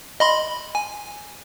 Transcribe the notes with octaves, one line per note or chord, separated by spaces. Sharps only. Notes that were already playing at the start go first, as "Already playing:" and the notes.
D#5 B5 C6
G#5